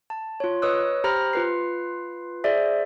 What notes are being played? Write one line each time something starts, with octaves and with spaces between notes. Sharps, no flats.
A5
F4 C#5
B4 C#5 D#5 D#6 E6 F#6
G4 C5 A#5 B5 F6 A#6
F4 B4 C7
G#4 C5 D5 E5